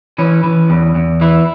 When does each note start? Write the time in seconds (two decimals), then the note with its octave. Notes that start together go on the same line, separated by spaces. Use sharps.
0.18 E3 C#4
0.44 E3
0.70 E2
0.95 E2
1.21 E3 E4